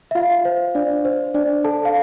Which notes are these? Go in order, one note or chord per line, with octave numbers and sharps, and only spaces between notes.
E5
F4 F5
C5
D4 D5
C5
D4 D5
A4 A5
F5